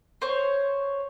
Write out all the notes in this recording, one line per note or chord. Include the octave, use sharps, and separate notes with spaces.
C5 C#5